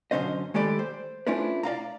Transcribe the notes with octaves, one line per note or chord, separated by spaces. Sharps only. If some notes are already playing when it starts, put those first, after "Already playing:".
F#2 D3 D#3 C#4 C5 D#5
D#3 G#3 A3 G4 D5 B5
C5
A3 C#4 D4 E4 F4 B4
D5 D#5 F5 A#5